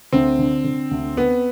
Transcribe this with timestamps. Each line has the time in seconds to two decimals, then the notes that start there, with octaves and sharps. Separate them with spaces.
0.13 D2 C4
0.39 D3
0.64 D3
0.91 D2
1.17 B3 C4